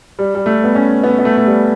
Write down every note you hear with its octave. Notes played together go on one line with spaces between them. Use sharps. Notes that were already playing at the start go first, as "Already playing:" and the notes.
G3
G3
A3
B3
C#4
B3
B3
A3
A3
G3